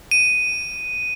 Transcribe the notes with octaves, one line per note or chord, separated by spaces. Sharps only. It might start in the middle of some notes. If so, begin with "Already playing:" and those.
D#7